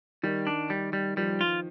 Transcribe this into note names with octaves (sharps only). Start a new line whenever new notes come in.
D#3 G3
D4
G3
G3
F3 G3
F4